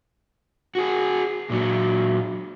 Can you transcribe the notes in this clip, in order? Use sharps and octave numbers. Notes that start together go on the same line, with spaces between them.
F#4 G#4
A#2 F#3